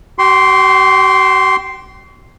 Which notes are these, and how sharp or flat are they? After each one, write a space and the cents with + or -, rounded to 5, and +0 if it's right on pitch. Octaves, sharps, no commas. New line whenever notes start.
F#4 +45 G5 -15 C6 +0